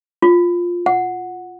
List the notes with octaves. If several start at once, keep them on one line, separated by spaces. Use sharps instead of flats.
F4
F#5